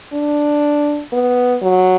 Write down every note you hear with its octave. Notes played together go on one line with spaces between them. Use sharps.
D4
B3
F#3